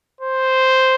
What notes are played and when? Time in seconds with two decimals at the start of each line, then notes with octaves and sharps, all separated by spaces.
0.21 C5